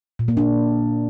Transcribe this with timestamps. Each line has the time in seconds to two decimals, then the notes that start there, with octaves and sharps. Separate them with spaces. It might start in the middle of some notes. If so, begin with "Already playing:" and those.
0.19 A#2
0.28 A#3
0.37 D4